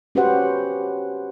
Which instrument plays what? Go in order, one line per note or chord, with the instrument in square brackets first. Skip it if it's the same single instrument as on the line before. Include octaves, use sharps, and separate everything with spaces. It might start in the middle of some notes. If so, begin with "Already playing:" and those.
[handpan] C#4 F#4 G4 B4 C5 F#5